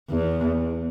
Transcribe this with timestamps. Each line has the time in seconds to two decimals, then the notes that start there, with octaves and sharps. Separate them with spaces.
0.10 E2